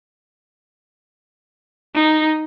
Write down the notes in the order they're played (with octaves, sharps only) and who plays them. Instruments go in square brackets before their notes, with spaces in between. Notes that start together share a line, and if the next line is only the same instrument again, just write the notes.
[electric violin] D#4